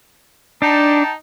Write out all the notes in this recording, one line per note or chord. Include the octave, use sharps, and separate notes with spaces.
D4 D#4 G5 A5